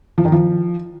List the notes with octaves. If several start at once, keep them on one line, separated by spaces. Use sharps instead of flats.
F3
D#3
F3